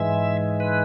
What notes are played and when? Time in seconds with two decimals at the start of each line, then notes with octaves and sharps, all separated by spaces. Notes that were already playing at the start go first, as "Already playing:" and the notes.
Already playing: G#2 E3 G#3 E5
0.60 B4